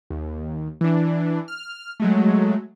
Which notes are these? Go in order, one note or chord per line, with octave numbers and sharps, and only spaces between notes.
D#2
E3 D4
F6
F#3 G#3 A3